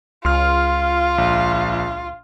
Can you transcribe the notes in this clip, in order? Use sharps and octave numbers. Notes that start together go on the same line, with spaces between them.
C#2 F4 C6 F6
A#1